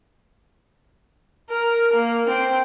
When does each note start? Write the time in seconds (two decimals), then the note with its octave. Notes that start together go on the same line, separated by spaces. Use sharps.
1.50 A#4
1.93 A#3
2.27 C4